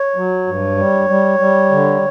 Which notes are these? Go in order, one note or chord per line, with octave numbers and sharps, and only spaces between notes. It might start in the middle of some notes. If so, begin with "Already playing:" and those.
Already playing: C#5
F#3
G2
G3
G3
G3
D3